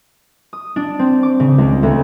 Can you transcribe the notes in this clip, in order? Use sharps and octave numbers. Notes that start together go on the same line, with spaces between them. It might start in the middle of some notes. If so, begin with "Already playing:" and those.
D#6
D4
C4
D6
C#3
C#2
D2